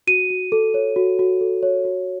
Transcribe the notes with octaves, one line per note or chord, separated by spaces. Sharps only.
F#4 D#7
F#4
A4
C#5
F#4
F#4
A4
C#5
F#4